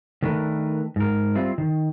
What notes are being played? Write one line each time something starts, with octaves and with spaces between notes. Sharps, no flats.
D#3 A3 D4 A#4 B4
G#2 A#4
G3 C4 E4 F4
D#3